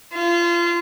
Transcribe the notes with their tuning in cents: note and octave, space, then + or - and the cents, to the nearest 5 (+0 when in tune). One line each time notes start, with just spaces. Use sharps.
F4 -25